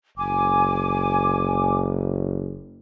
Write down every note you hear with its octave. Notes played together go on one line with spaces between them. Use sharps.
F#1 G#5 D6